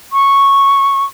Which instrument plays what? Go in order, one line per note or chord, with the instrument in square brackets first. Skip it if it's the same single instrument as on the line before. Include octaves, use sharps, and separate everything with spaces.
[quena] C#6